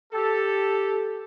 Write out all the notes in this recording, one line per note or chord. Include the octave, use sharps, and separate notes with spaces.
G4 A4